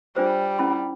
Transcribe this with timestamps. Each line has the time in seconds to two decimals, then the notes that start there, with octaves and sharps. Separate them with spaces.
0.16 G3 D4 F4 C5
0.59 C#4 E4 B5